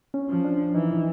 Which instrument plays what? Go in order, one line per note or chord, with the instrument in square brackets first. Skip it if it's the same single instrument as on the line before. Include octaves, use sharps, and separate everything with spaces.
[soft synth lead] C#4
[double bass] F3
[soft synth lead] D4
[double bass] E3 [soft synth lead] D#4